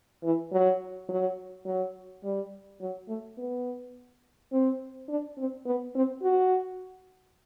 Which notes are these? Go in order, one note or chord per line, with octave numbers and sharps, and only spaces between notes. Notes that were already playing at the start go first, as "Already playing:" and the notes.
E3
F#3
F#3
F#3
G3
F#3
A3
B3
C4
D4
C4
B3
C4
F#4